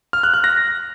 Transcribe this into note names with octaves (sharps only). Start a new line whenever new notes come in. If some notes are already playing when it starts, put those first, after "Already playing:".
F6
F#6
F#6
A#6